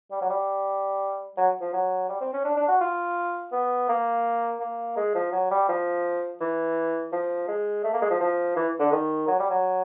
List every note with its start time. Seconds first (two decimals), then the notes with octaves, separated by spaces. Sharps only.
0.11 G3
0.21 F#3
0.30 G3
1.37 F#3
1.61 F3
1.73 F#3
2.09 G3
2.21 C4
2.33 C#4
2.44 D4
2.56 D4
2.68 F#4
2.81 F4
3.52 B3
3.89 A#3
4.60 A#3
4.96 G#3
5.15 F3
5.32 F#3
5.51 G3
5.69 F3
6.41 E3
7.12 F3
7.48 G#3
7.84 A3
7.93 A#3
8.02 G#3
8.10 F3
8.21 F3
8.56 E3
8.80 D3
8.92 D#3
9.28 F#3
9.39 G3
9.50 F#3